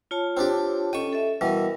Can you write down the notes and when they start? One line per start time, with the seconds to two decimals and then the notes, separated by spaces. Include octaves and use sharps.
0.11 F4 C#5 A5
0.37 C4 D4 G4
0.93 C#4 A4 D#5 G5 C#6
1.13 A4 E5
1.41 B2 E3 G3 A#4